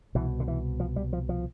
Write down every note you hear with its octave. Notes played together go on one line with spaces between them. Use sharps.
C2 B2 E3
D3
E3
F3
G3
F3
F3